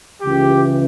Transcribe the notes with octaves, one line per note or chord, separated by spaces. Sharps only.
C#2 C#3 E3 G4